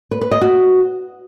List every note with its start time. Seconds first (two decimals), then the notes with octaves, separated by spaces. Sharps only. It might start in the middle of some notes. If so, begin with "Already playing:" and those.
0.11 B4
0.21 B4
0.31 D#5
0.41 F#4